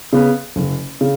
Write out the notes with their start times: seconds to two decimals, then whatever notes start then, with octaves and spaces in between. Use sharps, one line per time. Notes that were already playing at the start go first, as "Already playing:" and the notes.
0.13 C#3 B3
0.56 F#1
1.01 C#3